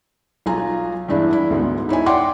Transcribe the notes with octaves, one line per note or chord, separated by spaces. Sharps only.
B1 F4 G#5 A#5
E2 G2 G#3 D4 E4
E4
D2 G#2 B3
D#4 E4 C#5 G#5
D5 F#5 G5 C6 D6